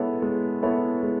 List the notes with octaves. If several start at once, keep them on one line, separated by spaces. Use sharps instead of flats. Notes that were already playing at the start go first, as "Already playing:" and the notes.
Already playing: G#3 B3 E4 A4 C#5
G#3
B3 E4 A4 C#5
G#3